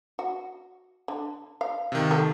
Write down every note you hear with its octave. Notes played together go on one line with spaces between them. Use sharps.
F#4
D3
F5
C3 D#3
A3